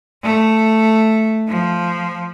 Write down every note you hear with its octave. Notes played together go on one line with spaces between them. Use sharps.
A3
F3